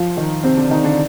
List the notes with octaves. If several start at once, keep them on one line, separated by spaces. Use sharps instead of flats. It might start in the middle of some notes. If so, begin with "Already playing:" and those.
Already playing: F3 F4
D#3 D#4
C3 C4
D3 D4
D#3 D#4
D3 D4